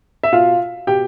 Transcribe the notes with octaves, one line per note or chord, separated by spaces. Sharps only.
E5
B2 F4 F5
B2 G4 G5